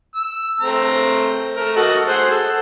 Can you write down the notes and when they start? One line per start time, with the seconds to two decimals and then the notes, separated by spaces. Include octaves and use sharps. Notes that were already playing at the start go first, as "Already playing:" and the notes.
0.15 E6
0.61 A3 C4 A#5
1.57 A3 A#4
1.76 F#4 A4 D#5
2.08 G#4 C5 F#5
2.31 A4